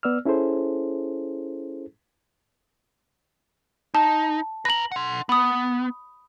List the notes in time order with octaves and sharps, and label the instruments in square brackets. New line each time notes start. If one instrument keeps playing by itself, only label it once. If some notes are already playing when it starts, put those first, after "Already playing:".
[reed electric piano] B3 D5 E6 F6
C#4 E4 G#4 A4 C5
[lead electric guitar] D#4 [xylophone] A5
[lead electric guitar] B4 A#5 [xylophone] A#6 F#7
[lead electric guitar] F#5 C6
[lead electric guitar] B3 [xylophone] B5 D#6